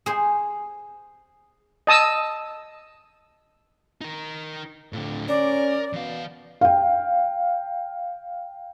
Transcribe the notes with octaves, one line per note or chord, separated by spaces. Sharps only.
G#4 C5
D#5 A5 D#6 E6
D#4 A#4
F2 A2 D3
C#4 A#4 D5
B2 E3 F5
F5 G5